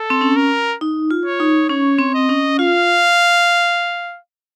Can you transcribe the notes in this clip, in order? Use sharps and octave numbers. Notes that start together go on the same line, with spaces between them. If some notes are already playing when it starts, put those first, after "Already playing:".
Already playing: A4
C4
C#4
A#4
D#4
F4
C#5
D#4
C#4 C#5
C4
D#5
C#4
F4 F5